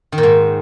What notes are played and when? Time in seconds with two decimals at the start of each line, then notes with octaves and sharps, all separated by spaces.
0.12 D#3
0.18 A#2
0.23 G#2